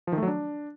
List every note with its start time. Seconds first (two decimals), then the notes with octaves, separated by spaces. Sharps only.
0.07 F3
0.12 D#3
0.17 A3
0.23 F#3
0.28 D4